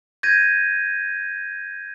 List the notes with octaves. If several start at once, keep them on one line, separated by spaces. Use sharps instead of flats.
G6 G#6 A#6 D#7